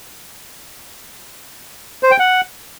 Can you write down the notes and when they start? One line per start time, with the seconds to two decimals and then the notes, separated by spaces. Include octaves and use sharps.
2.03 C5
2.11 G5
2.19 F#5